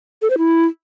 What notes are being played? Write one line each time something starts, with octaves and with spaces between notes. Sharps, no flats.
A4
C5
E4